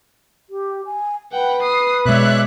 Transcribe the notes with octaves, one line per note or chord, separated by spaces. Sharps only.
G4
G#5
B4 F#5 G5
D#6 C7
B2 G#3 C#5 D5 E5 F#6